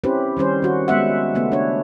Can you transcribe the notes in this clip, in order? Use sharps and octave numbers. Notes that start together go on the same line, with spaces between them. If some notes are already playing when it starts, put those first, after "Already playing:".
C4 C#4 E4 G4 B4 C5
D#3 G3 C#4 C5
D#3 F#4
G#3 B3 E5 F#5
C#3 A3 B3
D4 C#5